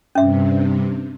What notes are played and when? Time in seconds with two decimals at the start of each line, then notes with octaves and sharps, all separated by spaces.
0.15 G2 C3 C#4 E5